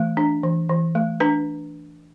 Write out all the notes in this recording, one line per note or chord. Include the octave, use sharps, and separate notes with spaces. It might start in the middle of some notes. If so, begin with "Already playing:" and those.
Already playing: E3 A3
D4
E3
E3
A3
D4 B4